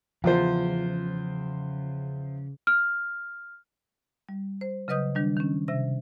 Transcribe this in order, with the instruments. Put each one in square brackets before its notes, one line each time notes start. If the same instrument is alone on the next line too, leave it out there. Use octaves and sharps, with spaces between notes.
[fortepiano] E2 F4 C5 [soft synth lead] C#3 [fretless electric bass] F3
[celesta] F6
[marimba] G3
C5
C#3 F#3 B4 D#5 D#6 G6
D#3 G3 D4
D#3 C#4
C3 E5 A#6